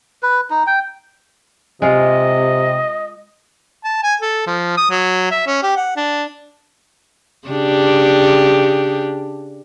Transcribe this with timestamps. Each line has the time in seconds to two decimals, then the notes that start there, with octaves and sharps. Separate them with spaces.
0.23 B4
0.50 D#4
0.67 G5
1.82 C3 G#3 F4 D#5
3.84 A5
4.03 G#5
4.22 A4
4.47 F3
4.78 D#6
4.91 F#3
5.31 E5
5.47 C#4
5.63 G4
5.76 F#5
5.97 D4
7.48 C#3 D4 G4